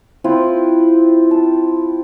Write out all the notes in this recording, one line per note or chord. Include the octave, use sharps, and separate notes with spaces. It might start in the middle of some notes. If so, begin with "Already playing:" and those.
C4 E4 F4 B4
A5